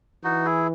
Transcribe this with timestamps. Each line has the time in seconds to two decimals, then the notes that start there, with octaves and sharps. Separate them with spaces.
0.24 E3 D#4 F#4
0.45 E4 G#4